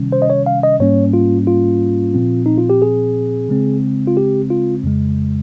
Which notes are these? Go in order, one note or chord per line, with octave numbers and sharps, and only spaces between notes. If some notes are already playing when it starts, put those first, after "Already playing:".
Already playing: C3 D#3 G3 C#4
C5
D#5
C#5
F5
D#5
G#2 G3 A#3 C#4 C#5
F4
F4
A#2 F3 C4
D#4
F4
G4
G#4
C#3 G#3 C4
F4
G4
F4
F2 C#3 G#3